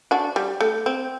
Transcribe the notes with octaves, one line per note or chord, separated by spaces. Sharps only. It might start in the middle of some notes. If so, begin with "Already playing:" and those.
D4 F#4
G3
A3
C4